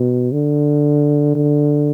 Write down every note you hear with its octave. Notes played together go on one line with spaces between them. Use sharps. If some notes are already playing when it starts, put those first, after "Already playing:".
Already playing: B2
D3
D3